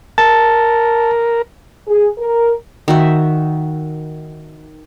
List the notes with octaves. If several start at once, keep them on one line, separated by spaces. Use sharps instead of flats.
A#4 A5
G#4
A#4
D#3 F#4 E5